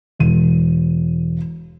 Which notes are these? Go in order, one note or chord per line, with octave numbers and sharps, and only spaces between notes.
E1 D#7